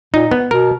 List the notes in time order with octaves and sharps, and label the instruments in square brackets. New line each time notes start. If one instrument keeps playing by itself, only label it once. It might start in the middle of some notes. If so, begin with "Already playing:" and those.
[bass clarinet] A#2 [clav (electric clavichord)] D#4
[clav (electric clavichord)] B3
[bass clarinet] B2 [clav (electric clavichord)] A#4